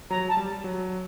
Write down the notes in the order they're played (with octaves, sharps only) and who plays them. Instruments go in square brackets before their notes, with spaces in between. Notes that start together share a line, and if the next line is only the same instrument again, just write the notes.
[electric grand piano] F#3 [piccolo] A#5
[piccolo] A5
[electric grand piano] G3
F#3